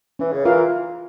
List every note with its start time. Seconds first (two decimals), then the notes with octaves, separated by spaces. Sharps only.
0.19 E3 C#4
0.32 C#3
0.45 E3 F4 A#4 F5